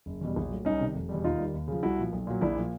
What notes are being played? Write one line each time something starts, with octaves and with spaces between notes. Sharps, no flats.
F#1
E2 B2 G3
A#1
A2 F#3
C2 C#4 D#4
C3 D#3 G3
F1
E2 B2 G3
D#2 D#4 F4
D#3 G3
D#2
C#3 F3
C2 E4 F#4
A#2 F3
B1
A#2 F#3
A#1 D4 E4
A#2 F3